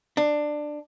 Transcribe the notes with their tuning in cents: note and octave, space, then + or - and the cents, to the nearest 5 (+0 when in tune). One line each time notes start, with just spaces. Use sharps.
D4 +15